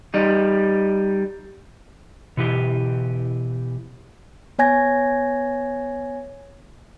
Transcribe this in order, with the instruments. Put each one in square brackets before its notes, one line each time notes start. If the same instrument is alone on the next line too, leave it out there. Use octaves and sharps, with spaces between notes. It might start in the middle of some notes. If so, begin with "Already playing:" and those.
[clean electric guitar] G3 D#4
[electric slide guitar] B2 E3 G4
[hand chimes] B3 C#5 G#5 G#6 A#6